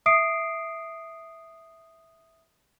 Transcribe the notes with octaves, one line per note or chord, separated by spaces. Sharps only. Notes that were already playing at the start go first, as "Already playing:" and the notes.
E5 D#6 C7 D7